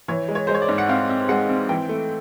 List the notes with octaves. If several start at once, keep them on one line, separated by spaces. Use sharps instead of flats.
E3 C#5
G#3
C#5
G#3 C5
C#5
D5
G#2
F#5
C4 F5
C4
G#3 F#5
C4
E3 G5
A3